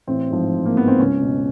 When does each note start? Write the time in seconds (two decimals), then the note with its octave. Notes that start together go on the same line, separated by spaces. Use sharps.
0.07 A1 C4
0.30 G#2 F3
0.53 A1
0.66 A#3
0.77 G#2 F3 B3
0.88 C4
0.99 C#2 C#4
1.22 B2